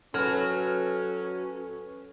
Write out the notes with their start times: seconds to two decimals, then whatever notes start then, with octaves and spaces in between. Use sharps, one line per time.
0.14 F#3 C#4 A4 B4 F6